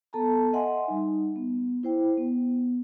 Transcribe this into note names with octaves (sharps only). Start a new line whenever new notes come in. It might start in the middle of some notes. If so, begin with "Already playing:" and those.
B3 A4 A5 A#5
D#5 E5 F#5 G#5 C6
G3 D#4
B3
E4 C5 G5
B3